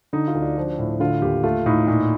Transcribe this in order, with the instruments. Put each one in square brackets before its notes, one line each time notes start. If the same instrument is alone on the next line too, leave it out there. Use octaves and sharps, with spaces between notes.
[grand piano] D3 D#4
F4
D2
D4
F3
A2
D3 F4
D#2 G4
A3 F4
A2 D#4
A#2 D#4